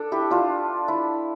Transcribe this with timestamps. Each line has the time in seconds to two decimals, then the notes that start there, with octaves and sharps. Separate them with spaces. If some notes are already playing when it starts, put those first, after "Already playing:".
Already playing: D4 A4
0.12 E4 G4
0.31 D4 F4
0.88 E4